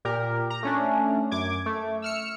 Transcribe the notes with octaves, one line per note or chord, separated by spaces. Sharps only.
A#2 G4 A#4
A#5
A3 C#4 D4
F#2 D6 G#6
A3
E6 F6 C#7